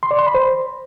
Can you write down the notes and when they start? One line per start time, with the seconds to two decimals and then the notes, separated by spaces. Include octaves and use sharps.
0.03 C6
0.11 D5
0.19 C6
0.27 B5
0.34 C5